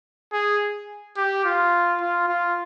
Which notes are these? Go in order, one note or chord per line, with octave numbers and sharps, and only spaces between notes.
G#4
G4
F4
F4
F4